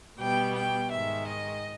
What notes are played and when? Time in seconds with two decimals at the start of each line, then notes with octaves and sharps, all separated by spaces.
0.18 B2 G3 B3 G5
0.55 G5
0.91 G#2 D#3 G#3 E5
1.27 D#5